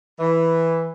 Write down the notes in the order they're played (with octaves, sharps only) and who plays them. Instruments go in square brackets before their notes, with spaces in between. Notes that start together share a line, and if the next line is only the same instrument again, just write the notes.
[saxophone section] E3